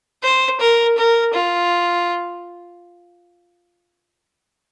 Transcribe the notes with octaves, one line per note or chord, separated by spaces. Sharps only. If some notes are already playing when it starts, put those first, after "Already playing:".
C5
A#4
A#4
F4